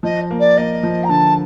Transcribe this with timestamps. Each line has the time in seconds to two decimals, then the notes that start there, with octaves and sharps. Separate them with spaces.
0.03 F3 D#5
0.31 A#3
0.39 D5
0.57 A#3 D#5
0.83 F3
1.04 A#5
1.09 D3 A5